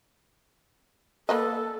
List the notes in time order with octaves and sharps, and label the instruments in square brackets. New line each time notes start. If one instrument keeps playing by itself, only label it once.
[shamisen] A#3 B4 D#5 [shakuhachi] A4